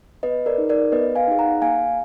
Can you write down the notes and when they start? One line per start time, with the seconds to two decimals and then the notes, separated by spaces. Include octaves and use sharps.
0.23 B3 B4 D#5
0.46 A#4 D5
0.58 D#4 G#4
0.69 A#4 D5
0.92 B3 B4 D#5
1.16 F5 G#5
1.27 D#4 G#4
1.39 F#5 A#5
1.61 A#3 F5 G#5